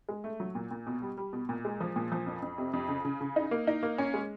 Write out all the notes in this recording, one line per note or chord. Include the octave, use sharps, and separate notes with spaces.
G#3
A3
F#3
A#2
A#2
B2
G3
G3
B2
A#2
G#3
F3
A#2
F3
F2
F2
C3
F2
C#3
C#3
C#3
D#4
A#3
D#4
A#3
C#4
G#3